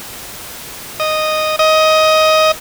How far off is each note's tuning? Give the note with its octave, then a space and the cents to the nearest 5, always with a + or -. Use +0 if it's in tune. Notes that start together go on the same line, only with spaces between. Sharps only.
D#5 -5
D#5 +15